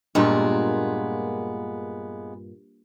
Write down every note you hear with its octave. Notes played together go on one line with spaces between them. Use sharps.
G2 A#2 G#3 A#3 B3 F4